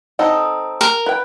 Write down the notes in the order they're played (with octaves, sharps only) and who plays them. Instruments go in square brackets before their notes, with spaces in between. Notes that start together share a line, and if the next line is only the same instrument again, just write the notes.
[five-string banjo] C4 D#4 A4
[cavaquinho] A#4
[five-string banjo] B4 G5